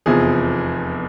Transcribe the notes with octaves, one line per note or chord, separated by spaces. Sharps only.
F1 E2 C3 F3 G#4